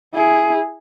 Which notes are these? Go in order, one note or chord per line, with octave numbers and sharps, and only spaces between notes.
E4 G#4